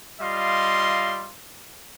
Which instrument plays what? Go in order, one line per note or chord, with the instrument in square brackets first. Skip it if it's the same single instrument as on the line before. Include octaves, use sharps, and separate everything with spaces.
[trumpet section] G3 F4 D#5 F5 C6